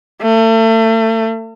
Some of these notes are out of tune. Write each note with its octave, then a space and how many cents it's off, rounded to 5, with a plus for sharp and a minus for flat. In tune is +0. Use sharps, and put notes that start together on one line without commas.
A3 +35